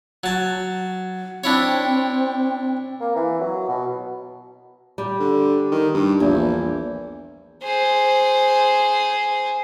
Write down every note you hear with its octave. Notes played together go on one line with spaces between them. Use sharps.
F#3 A5
C4 D4 E4 C#5
A#3
E3
F#3
B2
G3
D3
D#3
G2
A#1 E2
G#4 C5